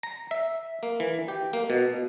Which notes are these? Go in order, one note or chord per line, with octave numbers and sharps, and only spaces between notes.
A#5
E5
A#3
E3
G4
A#3
B2